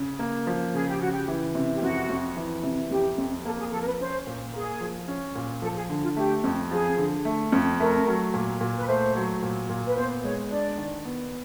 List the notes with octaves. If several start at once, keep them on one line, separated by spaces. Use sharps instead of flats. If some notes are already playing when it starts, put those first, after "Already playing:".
Already playing: C#3
A#3
F3
C#3 G#4
G4
C#3 F#4
G4
E3
C3
G4
F2 F#4
F2
E3
C3
F2 G4
F2
A#3 A4
G#4
F3 A4
A#4
B4
C#4 C5
A#2
A#3 G#4
F3
C#4
A#2
F3 A4
G#4
D3
F4
A3 G4
F2
F3 G#4
D3
A3
F2
A3 A#4
F#3
A#2
A#2
B4
A3 C5
F#3
A#2
A#2
B4
B3 C5
G#3 C#5
D4 D5
D#3
B3